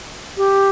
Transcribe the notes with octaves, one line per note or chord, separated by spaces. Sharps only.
G4